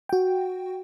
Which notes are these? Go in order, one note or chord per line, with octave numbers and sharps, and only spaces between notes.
F#4 G5